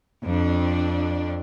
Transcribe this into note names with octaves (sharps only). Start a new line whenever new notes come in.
F2 D4